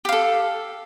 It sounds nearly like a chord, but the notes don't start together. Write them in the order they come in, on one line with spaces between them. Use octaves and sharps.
G4 F5 A4